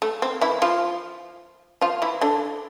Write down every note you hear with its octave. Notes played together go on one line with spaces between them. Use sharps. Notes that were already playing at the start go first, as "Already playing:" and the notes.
A3
C4
E3 E4
F3 F4
F3 F4
E3 E4
D3 D4